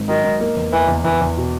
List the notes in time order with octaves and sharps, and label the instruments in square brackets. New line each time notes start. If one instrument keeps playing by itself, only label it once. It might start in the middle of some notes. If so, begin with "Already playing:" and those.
Already playing: [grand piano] G#1 G#2
[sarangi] D#3 [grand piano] F#3
[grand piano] G#2
A#3
E2
[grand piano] E2 [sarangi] E3
[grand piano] E2
[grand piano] E2 [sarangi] E3
[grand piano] E2
B2